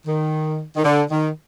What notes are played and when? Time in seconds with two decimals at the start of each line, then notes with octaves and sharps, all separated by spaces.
0.06 D#3
0.76 D#3
0.84 D3
1.11 D#3